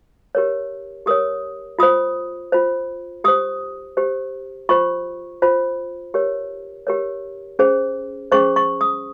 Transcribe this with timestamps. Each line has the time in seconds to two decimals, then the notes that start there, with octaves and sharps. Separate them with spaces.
0.35 G4 A#4 C#5
1.06 G4 A#4 C#5 D#6
1.79 F4 C5 D#6
2.52 F4 C5
3.24 G4 C5 D#6
3.97 G4 C5
4.69 F4 C5 C#6
5.42 F4 C5
6.14 G4 A#4 C#5
6.87 G4 A#4 C#5
7.59 C#4 G#4 C5
8.32 C#4 G#4 C5 C#6
8.56 C#6
8.81 D#6